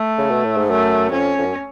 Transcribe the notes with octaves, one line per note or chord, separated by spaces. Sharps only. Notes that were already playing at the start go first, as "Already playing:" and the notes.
Already playing: A3
C#3
B2
A2
G#2
F#2 A3
F2 C#4
F2
F#2